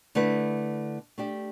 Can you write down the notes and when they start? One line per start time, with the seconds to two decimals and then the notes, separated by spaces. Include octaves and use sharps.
0.15 D3 A3 E4 B4
1.18 A3 D4 G4